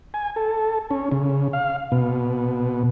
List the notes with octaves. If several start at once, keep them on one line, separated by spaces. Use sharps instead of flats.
G#5
A4
C#4
C#3
F5
B2